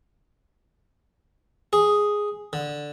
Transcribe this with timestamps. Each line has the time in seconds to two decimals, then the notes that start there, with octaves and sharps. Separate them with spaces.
1.73 G#4
2.53 D3